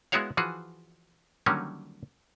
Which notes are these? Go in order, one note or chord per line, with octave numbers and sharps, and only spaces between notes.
G#3 B3 E4 F#4 C#5 F5
E3 F3 F#4 G#4
D3 D#3 F#3 G3 A#3 C#4